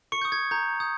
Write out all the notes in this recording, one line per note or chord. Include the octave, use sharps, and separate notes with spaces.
C#6 C#7
D#6 G6
G#6
A#5 G6
D#6 G6